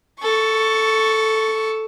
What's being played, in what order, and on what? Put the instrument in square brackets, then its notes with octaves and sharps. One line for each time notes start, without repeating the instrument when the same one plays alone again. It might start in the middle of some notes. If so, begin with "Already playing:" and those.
[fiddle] A4 C#6